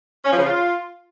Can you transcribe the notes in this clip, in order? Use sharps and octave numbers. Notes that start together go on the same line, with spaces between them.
C#4
F3
C#3
F4